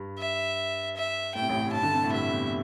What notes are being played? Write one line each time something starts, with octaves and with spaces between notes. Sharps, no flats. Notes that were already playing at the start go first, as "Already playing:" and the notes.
Already playing: G2
E5
E5
A2 G5
C3
A1 A2
G2 A5
D3
C3
A2
G2 E5
E2